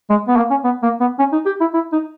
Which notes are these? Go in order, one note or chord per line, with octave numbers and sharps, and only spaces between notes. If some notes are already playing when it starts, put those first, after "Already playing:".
G#3
B3
A#3
C#4
B3
A#3
B3
C#4
D#4
G4
E4
E4
D#4